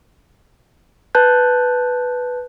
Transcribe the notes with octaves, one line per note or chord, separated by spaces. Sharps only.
B4 A5 F#6 G6